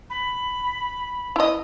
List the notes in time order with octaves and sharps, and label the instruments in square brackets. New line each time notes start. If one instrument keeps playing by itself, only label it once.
[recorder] B5
[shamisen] E4 D#5